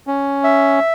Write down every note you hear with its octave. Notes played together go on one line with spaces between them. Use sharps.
C#4
E5